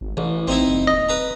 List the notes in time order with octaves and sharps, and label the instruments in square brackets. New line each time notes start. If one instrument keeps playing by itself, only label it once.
[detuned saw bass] G#1
[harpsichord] A1 [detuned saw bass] E3
[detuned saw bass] A1 [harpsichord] C4 D#4 E4
[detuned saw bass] F#1
[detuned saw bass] D#1 [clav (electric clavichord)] D#5
[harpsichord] B4 A#5